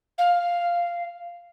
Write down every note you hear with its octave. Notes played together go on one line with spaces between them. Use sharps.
F5